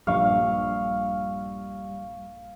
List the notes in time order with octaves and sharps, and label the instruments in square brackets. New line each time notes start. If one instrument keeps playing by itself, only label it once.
[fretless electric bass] A#1 G2 F3 [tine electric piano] G3 C#6 [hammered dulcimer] F5